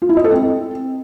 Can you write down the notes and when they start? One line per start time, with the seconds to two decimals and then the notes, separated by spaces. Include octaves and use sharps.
0.02 F4
0.09 E4
0.17 D#5
0.24 A4
0.32 C4